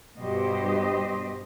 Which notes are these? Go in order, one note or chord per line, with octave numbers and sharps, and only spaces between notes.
G2 B2 G4 C5 D#5